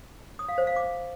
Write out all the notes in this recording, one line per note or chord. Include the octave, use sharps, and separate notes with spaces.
D#6
F5
C5
F5
D6